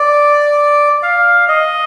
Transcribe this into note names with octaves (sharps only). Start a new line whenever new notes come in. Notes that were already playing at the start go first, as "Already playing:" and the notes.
Already playing: D5
F5
D#5